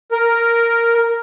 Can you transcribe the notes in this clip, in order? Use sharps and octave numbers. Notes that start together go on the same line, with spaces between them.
A#4